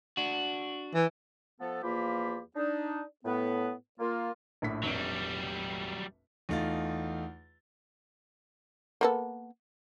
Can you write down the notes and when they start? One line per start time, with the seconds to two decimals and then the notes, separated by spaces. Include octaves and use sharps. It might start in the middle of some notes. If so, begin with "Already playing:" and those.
0.17 D4 F#4
0.94 E3
1.60 F3 B3 A4
1.83 E2 F3 A#3 F4 G4 B5
2.55 D4 D#4
3.25 A2 B3 B4
3.99 A#3 F4
4.62 A#1 A2 B6
4.83 F1 A#1 F#3 G3 D7
6.49 E2 A3 D#4 F4 A6
9.01 A#3 B3 A4